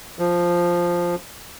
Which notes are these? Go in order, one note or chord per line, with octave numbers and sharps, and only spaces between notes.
F3